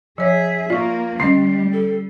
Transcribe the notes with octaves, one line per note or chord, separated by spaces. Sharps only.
F3 G#4 C#5 E5
A#3 F4 D5 C#6
D3 G3 G#3 C#4 D#5 C7
A4